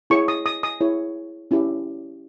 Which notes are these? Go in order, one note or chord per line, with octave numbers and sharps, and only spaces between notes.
E4 G#4 C#5 C#6
D#6
D#6
D#6
E4 G#4 C#5
C#4 E4 G4